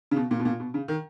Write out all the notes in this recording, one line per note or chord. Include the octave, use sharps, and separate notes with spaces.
C#3
B2
A#2
B2
A#2
B2
C#3
D#3